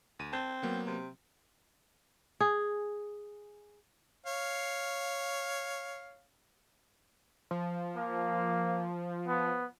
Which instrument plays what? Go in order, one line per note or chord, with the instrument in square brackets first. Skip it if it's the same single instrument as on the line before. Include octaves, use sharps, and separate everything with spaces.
[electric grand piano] D2 D#7
[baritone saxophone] C4 [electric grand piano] A5
[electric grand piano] F#3 A#3 B3
[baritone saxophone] C3
[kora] G#4
[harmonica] C#5 F5
[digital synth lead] F3
[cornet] A#3
B3